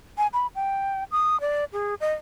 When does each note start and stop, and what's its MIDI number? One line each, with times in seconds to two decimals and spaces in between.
0.18 0.27 80
0.33 0.47 83
0.55 1.04 79
1.12 1.40 87
1.41 1.65 74
1.73 1.95 68
2.00 2.14 75